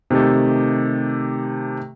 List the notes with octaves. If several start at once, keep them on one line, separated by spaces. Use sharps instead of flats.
C3 D#3 A3 G4 A4